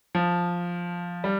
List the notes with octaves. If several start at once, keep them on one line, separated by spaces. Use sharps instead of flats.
F3
G3